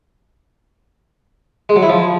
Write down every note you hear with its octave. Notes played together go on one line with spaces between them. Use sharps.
G#3
F#3
E4
F3